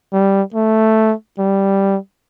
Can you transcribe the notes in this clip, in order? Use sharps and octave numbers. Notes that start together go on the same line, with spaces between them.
G3
A3
G3